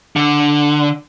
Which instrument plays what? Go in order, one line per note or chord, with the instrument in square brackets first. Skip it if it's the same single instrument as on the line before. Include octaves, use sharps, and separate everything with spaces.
[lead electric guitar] D3